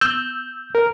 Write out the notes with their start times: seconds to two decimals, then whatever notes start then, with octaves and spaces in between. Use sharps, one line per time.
0.01 E6 G6
0.75 A#4